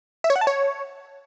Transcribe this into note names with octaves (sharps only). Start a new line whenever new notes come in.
E5
C#5
F#5
A5
C#5